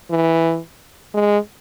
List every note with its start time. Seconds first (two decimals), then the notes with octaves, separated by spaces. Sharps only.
0.11 E3
1.14 G#3